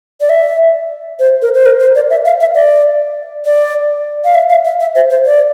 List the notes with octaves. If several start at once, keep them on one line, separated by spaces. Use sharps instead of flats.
D5
E5
C5
A#4
C5
A#4
C5
D5
E5
F5
E5
D5
D5
F5
E5
F5
E5
E5
C5
C5
D5